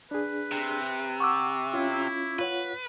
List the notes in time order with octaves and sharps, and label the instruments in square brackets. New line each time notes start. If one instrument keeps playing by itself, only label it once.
[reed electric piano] D4 G#4 [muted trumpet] B4
[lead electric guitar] C3
[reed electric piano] F#5 [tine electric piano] C#6 D6 E6
[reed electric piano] C#4 F4 [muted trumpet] E4
[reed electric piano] F4 C#5 F#5 [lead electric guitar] B4